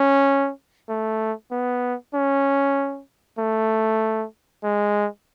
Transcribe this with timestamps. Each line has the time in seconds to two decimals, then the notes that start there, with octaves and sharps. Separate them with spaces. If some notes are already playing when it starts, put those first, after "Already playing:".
Already playing: C#4
0.89 A3
1.51 B3
2.14 C#4
3.39 A3
4.64 G#3